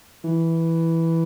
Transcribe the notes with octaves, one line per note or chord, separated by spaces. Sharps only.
E3